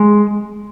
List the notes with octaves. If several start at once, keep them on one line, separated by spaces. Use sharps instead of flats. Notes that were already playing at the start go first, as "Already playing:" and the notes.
Already playing: G#3